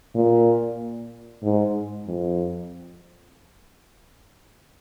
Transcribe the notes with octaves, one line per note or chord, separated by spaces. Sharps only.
A#2
G#2
F2